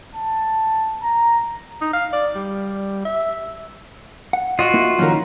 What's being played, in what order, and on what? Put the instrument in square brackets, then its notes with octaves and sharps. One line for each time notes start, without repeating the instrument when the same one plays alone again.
[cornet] A5
A#5
[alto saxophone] D#4
F5
D5
G3
E5
[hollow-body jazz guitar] F#5
[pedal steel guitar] F4 F#4 [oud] D#5
[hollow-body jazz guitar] A#3 E4
[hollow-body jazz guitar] D#3 F3 [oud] C#4 D#4 A#4